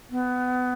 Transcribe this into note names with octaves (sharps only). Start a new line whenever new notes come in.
B3